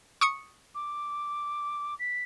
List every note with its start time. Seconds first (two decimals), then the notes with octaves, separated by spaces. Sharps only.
0.21 C#6 D#6 C#7
0.75 D6
1.99 B6